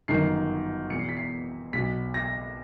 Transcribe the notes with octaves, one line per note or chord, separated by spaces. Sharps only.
G1 F#2 D#3 C7
E2 B2 C#7
C7
B6
C7
B1 B2 B6
A#6